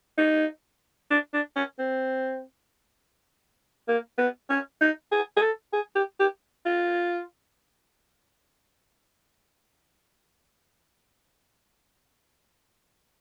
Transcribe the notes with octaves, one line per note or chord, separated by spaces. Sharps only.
D#4
D4
D4
C#4
C4
A#3
B3
C#4
D#4
G#4
G#4
A4
G#4
G4
G4
F4